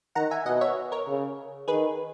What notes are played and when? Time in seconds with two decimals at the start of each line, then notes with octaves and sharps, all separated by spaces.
0.15 D#3 F#5 A#5
0.31 E5 G#5
0.46 B2 D#5 F#5
0.61 C#5 E5
0.92 A#4 C#5
1.07 C#3
1.68 D#3 G#4 B4